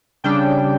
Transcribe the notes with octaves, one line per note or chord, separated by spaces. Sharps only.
C#3 G3 D4 G5